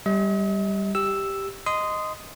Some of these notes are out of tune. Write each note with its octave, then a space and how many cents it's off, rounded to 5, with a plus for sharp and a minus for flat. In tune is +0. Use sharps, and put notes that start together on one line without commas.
G3 +0 D#5 +45
G4 +0 E6 +0
D#5 +0 C6 -20 D#6 +0